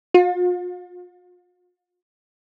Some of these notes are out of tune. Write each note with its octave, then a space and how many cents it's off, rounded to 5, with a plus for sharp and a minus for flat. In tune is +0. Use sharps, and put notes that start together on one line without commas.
F4 +40